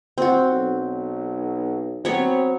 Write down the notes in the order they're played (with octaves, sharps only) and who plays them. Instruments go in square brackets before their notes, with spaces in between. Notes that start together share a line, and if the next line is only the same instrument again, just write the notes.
[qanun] C4 F#4
[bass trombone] B1
[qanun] F#3 B3 C#5 [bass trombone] C4